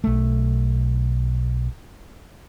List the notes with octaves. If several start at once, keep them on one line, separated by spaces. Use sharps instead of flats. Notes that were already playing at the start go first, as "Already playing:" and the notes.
B1 A3